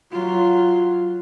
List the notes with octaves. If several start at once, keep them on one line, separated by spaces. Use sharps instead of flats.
F#3 F4